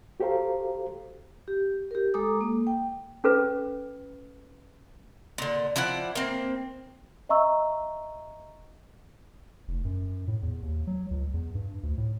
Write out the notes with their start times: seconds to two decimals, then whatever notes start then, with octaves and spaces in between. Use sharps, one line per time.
0.20 F#4 G4 A4 C5 F5 A#5
1.48 G4
1.91 G4 A#4
2.14 G#3 A4 A#5 D6 D#6
2.41 A#3
2.67 G5
3.24 C#4 A4 B4
5.38 A#2 D3
5.76 F3 E4 D5 F#5
6.15 A#3 C4
7.29 D#5 E5 A#5 C#6 E6
9.68 F1
9.85 F#2
10.27 A2
10.42 E2
10.63 D#2
10.87 F#3
11.11 C#2
11.34 E2
11.55 G2
11.83 D2
11.98 A2